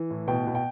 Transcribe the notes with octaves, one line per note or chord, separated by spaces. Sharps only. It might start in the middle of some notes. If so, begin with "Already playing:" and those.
Already playing: E3
A2
B2 G5
B2
G5